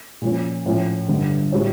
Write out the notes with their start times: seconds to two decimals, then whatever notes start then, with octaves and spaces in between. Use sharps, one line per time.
0.22 A#2 F3 C#4
0.66 A2 F3 C#4
1.09 G1 G2 D3
1.52 A2 G3 D4 F4 C#5